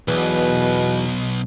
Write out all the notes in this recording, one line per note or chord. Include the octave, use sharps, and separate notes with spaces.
B1 E2 B2 E3 B4